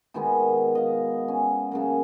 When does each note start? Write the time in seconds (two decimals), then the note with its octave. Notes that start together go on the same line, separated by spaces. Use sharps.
0.14 B2 D#3 G#3 B3
0.75 D#5 F5
1.28 C#4
1.71 C#3 F#3 A#3